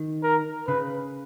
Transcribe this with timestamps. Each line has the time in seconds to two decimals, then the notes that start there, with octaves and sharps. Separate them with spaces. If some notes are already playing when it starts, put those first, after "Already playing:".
Already playing: D#3
0.23 A#4
0.67 C#3 B4